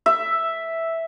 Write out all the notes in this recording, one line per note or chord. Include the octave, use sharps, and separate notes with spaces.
E5